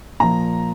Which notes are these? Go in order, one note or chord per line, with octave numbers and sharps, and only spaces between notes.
A#2 F3 A#5